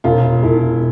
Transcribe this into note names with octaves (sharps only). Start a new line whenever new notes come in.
E1 F4
E1 E4